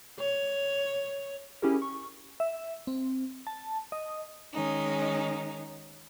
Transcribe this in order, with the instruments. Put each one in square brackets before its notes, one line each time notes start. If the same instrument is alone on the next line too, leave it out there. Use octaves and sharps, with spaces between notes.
[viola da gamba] C#5
[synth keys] C#4 E4 G4 G#4 A#4
C#6
[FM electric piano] E5
C4
A5
D#5
[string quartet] D#3 G#3 C#4 D#4